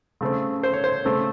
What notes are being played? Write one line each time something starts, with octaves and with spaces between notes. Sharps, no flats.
C#3 A3 C4
C5
C#5
C5
C#3 A3 C4